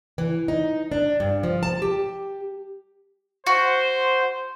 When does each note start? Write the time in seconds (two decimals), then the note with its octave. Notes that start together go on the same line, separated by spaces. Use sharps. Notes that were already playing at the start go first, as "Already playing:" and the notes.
0.18 E3
0.48 D#4
0.92 D4
1.20 G2
1.43 F3
1.63 A5
1.82 G4
3.47 F#4 C5